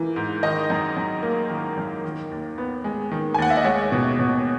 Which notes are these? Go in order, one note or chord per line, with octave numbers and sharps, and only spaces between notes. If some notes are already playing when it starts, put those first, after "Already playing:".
Already playing: G#2 E3 A#3
G#2
D#3 D#5
F#2
F#2
A#3
D#3
F#2
D#3
D#2
B3
G#3
D#3
G#5
D#2 F#5
E5
D#5
G#3 C#5
B2
B2